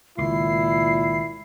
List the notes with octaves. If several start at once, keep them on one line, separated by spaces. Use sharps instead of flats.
C#2 A#2 D#3 E4 C7